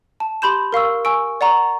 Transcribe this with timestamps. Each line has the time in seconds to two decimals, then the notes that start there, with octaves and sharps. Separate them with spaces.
0.20 A5
0.42 G4 B5 C6 G6 E7
0.72 A#4 F5 C#6 E6
1.05 G#5 C#6 E6 D7
1.41 D5 F#5 A#5 C#6